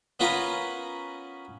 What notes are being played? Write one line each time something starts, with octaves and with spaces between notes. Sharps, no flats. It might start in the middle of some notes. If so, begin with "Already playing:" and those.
B3 C#4 F4 A#4 B4 A#5